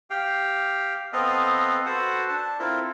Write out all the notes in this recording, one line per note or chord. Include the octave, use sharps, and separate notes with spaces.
G4 F5 G5
B3 C4 A4 B4 D#5 F5
F#4 A4 B4 C5 F#5
D4 A5
C4 E4 F4 A4 A#4